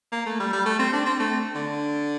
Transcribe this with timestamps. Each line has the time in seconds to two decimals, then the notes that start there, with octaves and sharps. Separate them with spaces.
0.12 A#3
0.26 A3
0.40 G3
0.53 G3
0.66 A3
0.79 C4
0.93 D4
1.06 C4
1.19 A3
1.55 D3